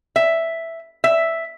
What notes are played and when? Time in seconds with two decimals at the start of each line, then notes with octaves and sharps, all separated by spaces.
0.16 E5
1.04 E5